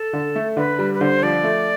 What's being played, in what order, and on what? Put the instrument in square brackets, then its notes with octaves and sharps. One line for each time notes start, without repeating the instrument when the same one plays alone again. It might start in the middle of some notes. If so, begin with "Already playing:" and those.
Already playing: [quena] A4
[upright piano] D3
A3
[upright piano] D3 [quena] B4
[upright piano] G3
[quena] B4
[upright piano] D3 [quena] C5
[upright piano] F3 [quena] D5
[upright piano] A3